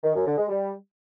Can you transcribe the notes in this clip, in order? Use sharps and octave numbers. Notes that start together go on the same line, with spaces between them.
D#3
F#2
D3
G#3
G3